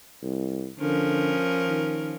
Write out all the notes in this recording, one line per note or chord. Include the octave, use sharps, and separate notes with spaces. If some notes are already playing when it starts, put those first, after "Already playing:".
C2
D3 F3 C#4 A#4
D#3